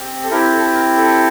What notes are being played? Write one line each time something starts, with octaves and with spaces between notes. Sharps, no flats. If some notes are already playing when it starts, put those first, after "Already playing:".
Already playing: C4 G4
A4
C4 E4 G4 A#4
A4
A#4
A4